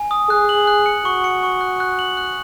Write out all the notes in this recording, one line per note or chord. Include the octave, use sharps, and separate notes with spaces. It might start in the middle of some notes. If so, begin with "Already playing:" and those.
Already playing: G#5
D#6
G#4 F#6
F#7
F#6
C#7
F#4 C#6
C#7
C#6
F#6
F#6
F#7
F#6